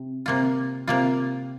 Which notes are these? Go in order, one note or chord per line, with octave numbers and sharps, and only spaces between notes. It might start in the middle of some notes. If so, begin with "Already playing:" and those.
Already playing: C3
C3 A#3 F4
C3 A#3 F4